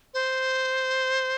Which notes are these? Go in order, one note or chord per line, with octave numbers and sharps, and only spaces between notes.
C5